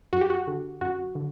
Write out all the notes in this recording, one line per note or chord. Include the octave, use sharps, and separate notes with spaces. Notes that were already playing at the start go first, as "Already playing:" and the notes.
F#2 F#4
G4
F#4
D3
F#2 F#4
D3